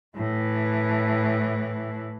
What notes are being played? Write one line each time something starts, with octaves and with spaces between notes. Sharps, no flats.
A2 E3